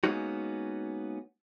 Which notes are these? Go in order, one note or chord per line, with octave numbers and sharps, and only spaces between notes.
G#3 A#3 B3 C#4 D#4 F#4